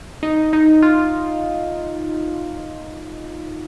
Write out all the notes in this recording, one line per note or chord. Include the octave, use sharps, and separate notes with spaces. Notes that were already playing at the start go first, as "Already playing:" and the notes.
D#4
D#4
F4